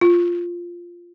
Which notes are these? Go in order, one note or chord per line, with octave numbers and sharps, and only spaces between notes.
F4